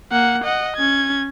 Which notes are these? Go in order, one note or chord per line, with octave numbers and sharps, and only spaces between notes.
A#3 F#5
D#5 F#5
C#4 G#6